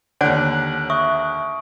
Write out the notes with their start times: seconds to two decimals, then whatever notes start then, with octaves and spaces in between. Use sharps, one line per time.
0.21 D#2 D3 C#5 D5 F#5 F#6 D7
0.90 E5 C#6 D#6